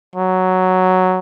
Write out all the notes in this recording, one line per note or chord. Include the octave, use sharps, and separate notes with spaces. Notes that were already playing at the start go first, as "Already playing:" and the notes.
F#3